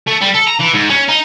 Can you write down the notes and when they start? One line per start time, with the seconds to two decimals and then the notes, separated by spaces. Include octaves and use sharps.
0.07 A3
0.21 G3
0.34 A4
0.47 A#5
0.59 E3
0.73 G#2
0.90 C#4
1.08 D#4